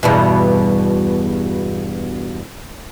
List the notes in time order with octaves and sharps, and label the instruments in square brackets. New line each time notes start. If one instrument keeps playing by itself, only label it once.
[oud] E2 G2 B2